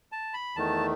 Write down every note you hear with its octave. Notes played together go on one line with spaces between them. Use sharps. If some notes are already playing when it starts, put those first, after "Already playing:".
A5
B5
E2 D#3 A3 A5